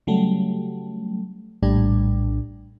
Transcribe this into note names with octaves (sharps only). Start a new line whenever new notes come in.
C#3 F#3 G3 A3
A#1 A2 G3 D4